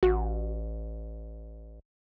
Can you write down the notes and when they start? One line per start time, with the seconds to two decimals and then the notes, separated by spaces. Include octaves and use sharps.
0.03 A1 F#4